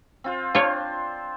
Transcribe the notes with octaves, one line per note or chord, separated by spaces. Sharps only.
C4 F4 C5
D4 F4 C5 C#5